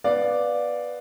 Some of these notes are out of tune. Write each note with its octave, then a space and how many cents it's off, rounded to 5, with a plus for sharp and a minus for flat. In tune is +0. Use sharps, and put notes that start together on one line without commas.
B3 +0 D5 +0 F5 +10